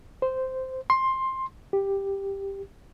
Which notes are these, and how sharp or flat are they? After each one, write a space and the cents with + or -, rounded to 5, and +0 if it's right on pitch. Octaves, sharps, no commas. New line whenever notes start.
C5 -10
C6 +15
G4 +5